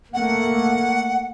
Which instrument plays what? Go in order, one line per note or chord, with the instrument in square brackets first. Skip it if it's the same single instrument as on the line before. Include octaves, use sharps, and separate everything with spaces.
[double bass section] A3 A#3 [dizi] F#5